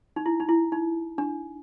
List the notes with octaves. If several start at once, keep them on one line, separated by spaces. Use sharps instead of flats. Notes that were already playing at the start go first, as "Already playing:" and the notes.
D#4
E4
D#4
E4
D#4
D4